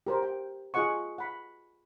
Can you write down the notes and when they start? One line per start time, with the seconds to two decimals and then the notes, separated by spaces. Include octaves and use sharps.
0.07 G4 A#4 C5
0.23 G5
0.74 F4 G#4 D#5 F#5 C#6
1.18 F#5 B5